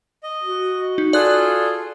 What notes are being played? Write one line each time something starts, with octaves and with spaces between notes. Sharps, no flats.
D#5
F#4
D#4
F4 G#4 A4 D5 F#6